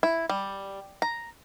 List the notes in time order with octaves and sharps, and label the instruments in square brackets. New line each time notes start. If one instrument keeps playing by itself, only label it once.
[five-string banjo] E4
G3
A#5